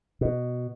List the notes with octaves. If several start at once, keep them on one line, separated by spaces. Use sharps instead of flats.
B2